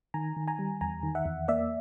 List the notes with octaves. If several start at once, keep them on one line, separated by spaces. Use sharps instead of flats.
D#3 G#5 A#5
D#3
G#5 A#5
G3
E2 G#5 A#5
D#3
E5 F#5
E2
A#3 D5 E5